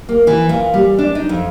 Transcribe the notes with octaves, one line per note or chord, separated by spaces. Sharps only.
A#3
E3
A#2
G3
D4
D#4
F2